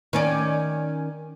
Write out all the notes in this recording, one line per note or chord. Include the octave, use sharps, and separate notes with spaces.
D#3 C#4 D5